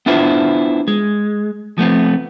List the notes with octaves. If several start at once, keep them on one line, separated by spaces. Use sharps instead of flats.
B3 D4 E4 F4 B4 C5
G#3
F3 A3 B3 C4